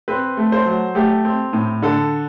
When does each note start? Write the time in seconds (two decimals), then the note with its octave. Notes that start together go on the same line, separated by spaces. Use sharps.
0.08 C4 B4
0.37 A3
0.52 C5
0.66 F#3
0.95 A3 G4
1.25 C4
1.53 A2
1.82 D3 A4